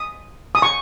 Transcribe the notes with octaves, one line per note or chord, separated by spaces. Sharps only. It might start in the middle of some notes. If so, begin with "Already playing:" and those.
Already playing: D#6
D#6
C#6